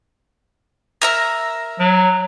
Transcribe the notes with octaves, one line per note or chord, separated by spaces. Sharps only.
A#4 E5 A#5
F#3